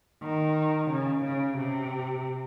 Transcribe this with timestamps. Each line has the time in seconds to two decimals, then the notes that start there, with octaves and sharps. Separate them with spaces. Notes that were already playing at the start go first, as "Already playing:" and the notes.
0.22 D#3
0.90 C#3
1.24 C#3
1.58 C3